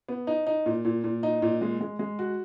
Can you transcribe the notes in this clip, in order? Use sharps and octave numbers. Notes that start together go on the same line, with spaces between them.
B3
D#4
D#4
A#2
A#2
A#2
D#4
A#2
G#3
G#3
G#3
F#4